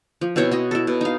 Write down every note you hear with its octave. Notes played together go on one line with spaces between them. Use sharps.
F3
B2 C4 E4 C#5
F#4 C#5 D#5
E4 A4
B2
D#4 F5